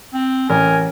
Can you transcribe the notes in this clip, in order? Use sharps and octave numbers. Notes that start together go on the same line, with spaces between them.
C4
A1 A#4 G#5